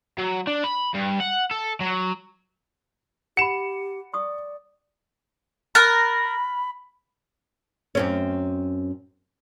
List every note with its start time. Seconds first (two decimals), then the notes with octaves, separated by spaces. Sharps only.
0.18 F#3
0.47 D4
0.64 B5
0.94 G2
1.20 F#5
1.51 A4
1.80 F#3
3.37 G4 F#5 B5 C#7 E7
4.14 D5 C#6 D#6
5.75 A#4 B5 F6 F#6 A6
7.95 F#2 C4 C#4